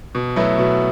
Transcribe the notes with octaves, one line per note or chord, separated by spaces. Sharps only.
B2
F#3 A3 E4 B4
B2